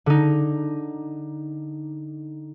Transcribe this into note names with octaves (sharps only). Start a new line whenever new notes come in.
D3 D#4